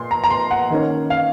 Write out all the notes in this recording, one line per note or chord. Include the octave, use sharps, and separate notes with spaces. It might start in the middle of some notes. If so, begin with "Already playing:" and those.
Already playing: A#2 C6
A#5
A#5
C6
F#5
D#3 A#3 C#4
F5